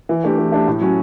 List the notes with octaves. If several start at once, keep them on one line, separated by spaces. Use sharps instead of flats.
E3
A3 D4 G4
E3
A3 D4 G4
A2
F#3 C#4